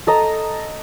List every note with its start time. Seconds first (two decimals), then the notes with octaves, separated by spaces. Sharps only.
0.07 A4 D#5 A#5